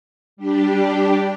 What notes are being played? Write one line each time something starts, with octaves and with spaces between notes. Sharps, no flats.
G3 D4 G4